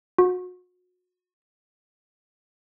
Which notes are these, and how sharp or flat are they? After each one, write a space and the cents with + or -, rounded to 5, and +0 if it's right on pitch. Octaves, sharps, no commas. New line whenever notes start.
F#4 -35